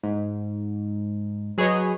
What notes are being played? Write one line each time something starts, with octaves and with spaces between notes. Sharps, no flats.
G#2
F#3 G#4 B4 C#5 D#5